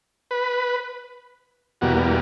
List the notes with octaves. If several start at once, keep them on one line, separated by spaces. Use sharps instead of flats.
B4
E2 B2 G3 A#3 F#4